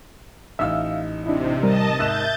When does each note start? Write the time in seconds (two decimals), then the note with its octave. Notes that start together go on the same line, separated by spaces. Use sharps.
0.59 A1 D#4 E5 F5 E6
1.24 C3 D4 E4 D#5
1.63 G3 A#4 D#5 A5
1.99 G#2 E5 F#6 G6 A6 E7